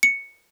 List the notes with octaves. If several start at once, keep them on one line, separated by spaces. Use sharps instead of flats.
C#7